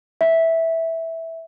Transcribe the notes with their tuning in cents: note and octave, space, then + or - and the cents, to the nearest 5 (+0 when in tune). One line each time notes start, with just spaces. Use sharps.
E5 -10